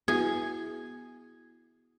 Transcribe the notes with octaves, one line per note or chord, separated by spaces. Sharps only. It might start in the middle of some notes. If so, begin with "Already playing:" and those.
B3 E4 F#4 G#4